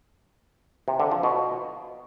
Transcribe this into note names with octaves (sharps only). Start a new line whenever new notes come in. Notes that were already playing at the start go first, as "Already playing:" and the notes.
C3
D3
F3
B2